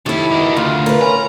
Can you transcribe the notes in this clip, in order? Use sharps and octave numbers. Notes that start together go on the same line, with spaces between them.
A2 D#3 E4 G4 A5
B2 G4 A#4
D2 C#3 F4
A#4 B4
C#4 A#5